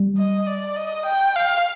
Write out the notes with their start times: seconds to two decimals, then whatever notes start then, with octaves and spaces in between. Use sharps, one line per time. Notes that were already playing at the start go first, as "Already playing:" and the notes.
Already playing: G3
0.17 D#5
0.47 D5
0.76 D#5
1.06 G5
1.36 F5